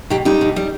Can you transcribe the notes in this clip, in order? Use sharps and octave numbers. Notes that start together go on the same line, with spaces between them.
B2 D#4 G4
G3 D#4 G4
B2
G3